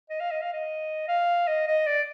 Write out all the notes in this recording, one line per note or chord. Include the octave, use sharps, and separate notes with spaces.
D#5
F5
D#5
F5
D#5
F5
D#5
D#5
D5